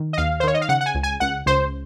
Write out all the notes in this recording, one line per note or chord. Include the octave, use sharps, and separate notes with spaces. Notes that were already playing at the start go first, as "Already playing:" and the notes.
Already playing: D#3
D#5
D#2 F5
C5
D#3 C#5
D#5
F5
C#3 F#5
F#5
G#5
C#2
G#5
C#2 F#5
C#2 C5